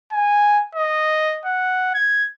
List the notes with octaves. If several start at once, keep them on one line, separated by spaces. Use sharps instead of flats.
G#5
D#5
F#5
G#6